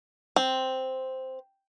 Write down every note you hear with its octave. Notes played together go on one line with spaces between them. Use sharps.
C4